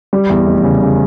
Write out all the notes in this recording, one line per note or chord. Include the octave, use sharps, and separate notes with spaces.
G3
E2
F1
C#3
C#3